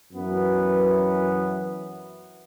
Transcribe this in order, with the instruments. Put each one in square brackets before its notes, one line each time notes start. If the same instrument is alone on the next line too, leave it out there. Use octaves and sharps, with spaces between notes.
[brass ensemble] F#2 E3 F#3 B3